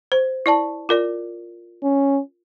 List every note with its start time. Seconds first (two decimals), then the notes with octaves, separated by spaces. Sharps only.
0.12 C5
0.46 E4 D5 A5
0.89 F4 A#4 D5
1.83 C#4